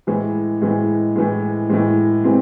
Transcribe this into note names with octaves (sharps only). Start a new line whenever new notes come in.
A2 E3 G#3
A2 E3 G#3
A2 E3 G#3
A2 E3 G#3
C3 E3 G#3 C4